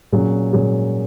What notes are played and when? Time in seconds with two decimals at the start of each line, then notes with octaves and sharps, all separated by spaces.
0.12 A#2 F#3 C#4 G#4
0.52 A#2 F#3 C#4 G#4